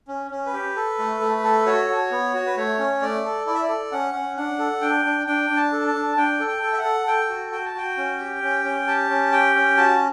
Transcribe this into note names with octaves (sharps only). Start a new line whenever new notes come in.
C#4
C#4
B4
G4
A4
A3
A3
A4
F#4 C#5
F#4
B3
F#4
B4
A3 C#5
C#4
A3 D5
A4
E4 D5
E5
D5
A4
C#4 F#5
C#4
D4 F#5
A4
D4 G5
D4
D4 G5
D4
A5
A4
A5
D4
D4 G5
A4
G5
A4
E5
F#5
A4
A4 G5
F#4
F#4 G5
A5
F#4 G5
C#4
G4
C#4
C#4
G4 A5
C#4
G4 G5
C#4
F#4 A5